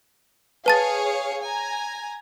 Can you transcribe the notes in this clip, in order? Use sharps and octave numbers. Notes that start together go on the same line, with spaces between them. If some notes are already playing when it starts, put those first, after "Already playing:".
G#4 B4 C#5 F5 A5 A6
G#5 A#5